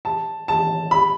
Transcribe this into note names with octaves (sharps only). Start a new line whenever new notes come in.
A5
A5
B5